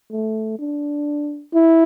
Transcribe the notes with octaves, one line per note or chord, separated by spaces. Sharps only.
A3
D4
E4